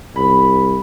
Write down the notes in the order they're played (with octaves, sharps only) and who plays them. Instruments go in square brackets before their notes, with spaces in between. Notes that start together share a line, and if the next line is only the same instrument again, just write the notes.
[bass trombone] C2 [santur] B5